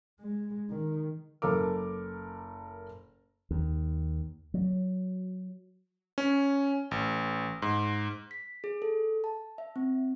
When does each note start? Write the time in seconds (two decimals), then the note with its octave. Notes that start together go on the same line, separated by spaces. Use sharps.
0.20 G#3
0.70 D#3
1.42 F#1 A4 A#4 D6
3.51 D#2
4.54 F#3
6.18 C#4
6.91 A1
7.62 G#2
8.31 B6
8.64 G#4
8.82 A4
9.24 A5
9.58 E5
9.76 C4